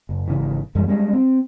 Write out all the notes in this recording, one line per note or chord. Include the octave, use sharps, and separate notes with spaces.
F#1
G#1 C#3 E3
F#2 E3 G3 G#3
G3 G#3 C#4
C4